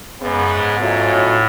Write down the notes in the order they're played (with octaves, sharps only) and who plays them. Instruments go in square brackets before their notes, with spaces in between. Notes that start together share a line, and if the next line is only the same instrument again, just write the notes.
[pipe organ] F#2 [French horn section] C#3 G#3 B3
[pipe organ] G#2
[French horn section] B2 F#3 A3 C#4 F4
[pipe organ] A2